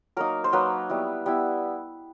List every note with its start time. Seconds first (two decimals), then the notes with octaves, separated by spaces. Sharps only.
0.17 F#3 A#3 D#4 A#4
0.44 C5
0.53 F#3 A#3 D#4 B4
0.89 G3 B3 E4
1.26 G3 B3 E4